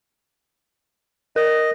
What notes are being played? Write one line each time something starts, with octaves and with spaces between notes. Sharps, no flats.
A#4 D#5